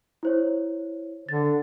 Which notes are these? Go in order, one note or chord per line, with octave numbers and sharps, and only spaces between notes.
E4 C5 C#5
D3 A6